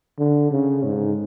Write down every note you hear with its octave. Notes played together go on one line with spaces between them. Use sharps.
D3
C#3
G#2